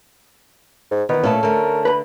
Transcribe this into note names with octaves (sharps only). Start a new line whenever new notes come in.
G#2
D#3 E3 B3
A#2 A3 C#4 A4 A5
D3 A3 A#4
B4 A#5 B5